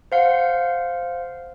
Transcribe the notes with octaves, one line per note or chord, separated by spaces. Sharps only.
C5 F5 F#5